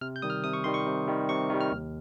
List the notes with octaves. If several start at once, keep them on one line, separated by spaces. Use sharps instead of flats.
C3 F6
G6
D#3 G3 D#6
F6
C3 D#6
C#6
D#3 G3 C6
C#6
C3
D#3 G3
C3 C#6
D#3 G3
F6
D#2